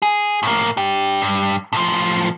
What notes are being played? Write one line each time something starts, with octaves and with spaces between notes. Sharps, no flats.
G#4
A2 A#3
D4 G4
G2
A2 F3